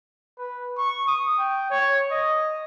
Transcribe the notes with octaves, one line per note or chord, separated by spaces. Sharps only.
B4
C#6
D#6
G5
C#5
D#5